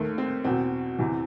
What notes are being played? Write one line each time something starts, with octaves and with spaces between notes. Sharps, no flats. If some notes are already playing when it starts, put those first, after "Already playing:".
Already playing: D#2 D#3 A3
C4
E2 B2 C4
E2 C3 E3